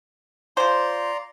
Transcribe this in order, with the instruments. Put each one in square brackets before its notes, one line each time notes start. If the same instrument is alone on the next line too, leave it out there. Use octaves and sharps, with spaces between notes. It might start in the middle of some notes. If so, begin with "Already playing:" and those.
[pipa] F3 C5 [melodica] D5 A#5 C6